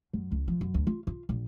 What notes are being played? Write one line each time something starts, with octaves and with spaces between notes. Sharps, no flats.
F#2
C#2
F3
F#2
D2
F4
F4
A#1